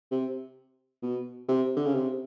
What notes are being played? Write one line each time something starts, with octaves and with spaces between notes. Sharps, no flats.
C3
B2
C3
D3
C#3
C3